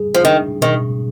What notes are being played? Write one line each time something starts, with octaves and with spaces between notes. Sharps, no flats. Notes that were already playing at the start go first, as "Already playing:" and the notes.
Already playing: G3 G#4
F3
D#3 D4
B2 D#3